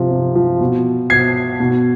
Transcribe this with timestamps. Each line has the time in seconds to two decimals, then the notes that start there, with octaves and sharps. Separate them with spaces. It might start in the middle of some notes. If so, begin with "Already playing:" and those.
Already playing: C3 F3
0.11 C3
0.36 F3
0.61 B2
1.10 B2 G#6 C7
1.60 B2